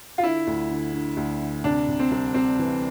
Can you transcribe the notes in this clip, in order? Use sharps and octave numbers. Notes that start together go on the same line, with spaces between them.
F4
D3 E4
D2
D3
D3
D2
D3
C3 D4
C3
C4
C2
C2 C4
E3